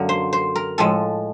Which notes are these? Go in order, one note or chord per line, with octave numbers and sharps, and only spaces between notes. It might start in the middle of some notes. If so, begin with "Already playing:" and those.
Already playing: F#2 D3 F#3 A#3
C5
C5
A#4
A2 F3 G#3 A4